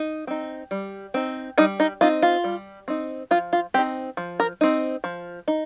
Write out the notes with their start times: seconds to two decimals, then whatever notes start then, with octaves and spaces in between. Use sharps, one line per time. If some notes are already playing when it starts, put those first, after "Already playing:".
Already playing: D#4
0.27 C4 D#4
0.71 G3
1.14 C4 D#4
1.58 G3 D#4
1.80 D#4
2.01 C4 D#4 F4
2.22 F4
2.44 G3
2.88 C4 D#4
3.31 F3 F4
3.53 F4
3.74 C4 D#4 G4
4.17 F3
4.40 A#4
4.61 C4 D#4
5.04 F3
5.48 D#4